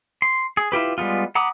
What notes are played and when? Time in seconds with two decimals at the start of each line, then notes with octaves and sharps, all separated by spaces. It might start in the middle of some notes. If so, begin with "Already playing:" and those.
0.22 C6
0.57 G#4
0.72 E4 F4 G4 B4
0.98 G3 G#3 B3 F4
1.35 F#5 A#5 B5 D6 D#6